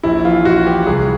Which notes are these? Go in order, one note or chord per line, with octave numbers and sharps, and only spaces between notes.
A#1 E4
E3 F4
A#1 F#4
E3 G4
C2 G#4